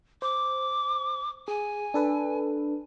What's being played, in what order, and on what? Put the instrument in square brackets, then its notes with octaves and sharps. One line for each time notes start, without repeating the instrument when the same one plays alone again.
[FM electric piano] C5 [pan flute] D6
[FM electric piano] G#4 [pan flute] G#5
[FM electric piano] D4 A4 B4